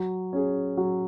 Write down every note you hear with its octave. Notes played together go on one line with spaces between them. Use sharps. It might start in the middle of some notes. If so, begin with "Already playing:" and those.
Already playing: F#3
C#4 G#4
F#3